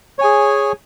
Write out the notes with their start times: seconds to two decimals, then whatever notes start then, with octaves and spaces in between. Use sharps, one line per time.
0.19 C#5
0.21 G#5
0.24 G#4